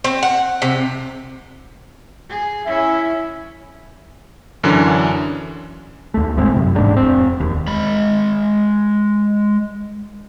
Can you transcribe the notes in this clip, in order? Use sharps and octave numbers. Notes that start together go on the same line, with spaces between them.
C4
F#5
C3
G#4
C#4 E4 E5
F#2 D3 E3 C#4 D4
D#2 A3
G1 A2 G#3 C4
F#2 C3
D#1 A1 G#2 D4
F1 C4
E1 D#2
G#3 B5